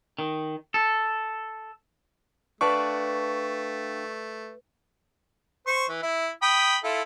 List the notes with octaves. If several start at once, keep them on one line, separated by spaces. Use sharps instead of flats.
D#3
A4
A3 D4 B4 D5 F5 G5 A5 C#6
C5 C#6
E3
E4
G5 B5 D#6
E4 F4 A4